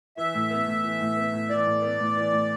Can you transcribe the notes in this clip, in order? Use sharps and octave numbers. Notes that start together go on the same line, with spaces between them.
E3 E5
A2
B3
A2
E3
A2
B3
A2
E3 D5
A2
B3
A2
E3
A2